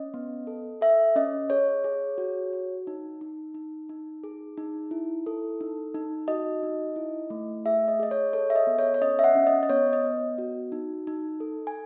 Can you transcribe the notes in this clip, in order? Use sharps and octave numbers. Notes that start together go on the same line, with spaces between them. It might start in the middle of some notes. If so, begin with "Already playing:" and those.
Already playing: C#4 D#5
B3
A4
A4 E5
C#4 D#5
G#4 C#5
G#4
F#4
F#4
D#4
D#4
D#4
D#4
G#4
D#4
E4
A4
D#4
D#4
F#4 D#5
D#4
E4
A3
G#4 E5
D#5
G#4 D#5
C#5
A4 C#5
E5
D#5
B3
C#5
C#5
C#4 D#5
E5
F#5
C#4
D#5
D#5
B3 C#5
D#5
B3
F#4
D#4
D#4
A4
G#5